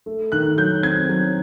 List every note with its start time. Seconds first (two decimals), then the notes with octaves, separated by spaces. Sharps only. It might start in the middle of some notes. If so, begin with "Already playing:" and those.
0.06 A3
0.32 D#3 F#6
0.58 F#3 G6
0.83 C4 G#6
1.09 F#3